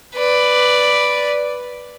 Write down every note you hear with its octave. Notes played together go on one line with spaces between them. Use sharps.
B4 D5